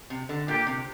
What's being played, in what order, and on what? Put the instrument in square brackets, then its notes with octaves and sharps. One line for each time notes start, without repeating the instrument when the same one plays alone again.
[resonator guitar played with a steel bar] C3
D3
[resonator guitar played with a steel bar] A#2 [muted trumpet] G4
[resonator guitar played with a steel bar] C3